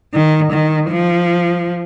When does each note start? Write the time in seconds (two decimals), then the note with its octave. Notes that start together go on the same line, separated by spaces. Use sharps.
0.14 D#3
0.52 D#3
0.90 F3